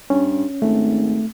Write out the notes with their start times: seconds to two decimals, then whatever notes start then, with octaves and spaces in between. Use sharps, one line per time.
0.10 G2 C#4
0.62 G#1 A3